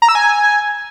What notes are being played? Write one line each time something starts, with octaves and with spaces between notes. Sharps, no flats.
A#5
E6
G#5